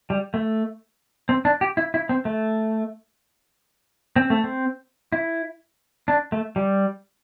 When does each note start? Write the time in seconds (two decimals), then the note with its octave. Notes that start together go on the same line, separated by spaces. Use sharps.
0.10 G3
0.34 A3
1.29 C4
1.45 D4
1.61 G4
1.77 E4
1.94 E4
2.09 C4
2.25 A3
4.16 C4
4.30 A3
4.44 C4
5.12 E4
6.08 D4
6.32 A3
6.56 G3